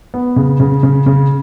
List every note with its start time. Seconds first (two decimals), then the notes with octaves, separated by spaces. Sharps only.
0.14 B3
0.36 C#3
0.60 C#3
0.83 C#3
1.06 C#3